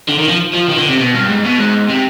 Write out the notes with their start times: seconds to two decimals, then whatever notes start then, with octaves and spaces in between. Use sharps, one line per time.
0.08 D3
0.18 D#3
0.28 F3
0.53 F3
0.69 D#3
0.78 D3
0.88 C3
0.99 B2
1.14 G2
1.29 G#2
1.44 B2
1.58 G#2
1.88 C3